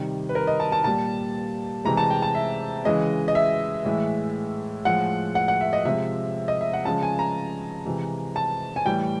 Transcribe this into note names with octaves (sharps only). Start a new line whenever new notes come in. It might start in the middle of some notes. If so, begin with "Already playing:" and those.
Already playing: C3 D#3 G3
B4
A#4
D#5
A5
A5
A#2 G3 A5
C3 E3 G#3 A#5
A5
G5
A5
E5
C#3 E3 G#3 D#5
D#5
E5
A2 E3 G#3
A2 F3 G#3 F#5
F#5
F#5
E5
D#5
C3 F3 G#3 E5
D#5
E5
F#5
C#3 F3 G#3 A5
G#5
A#5
C3 E3 G#3
A5
G#5
A2 E3 G3 G5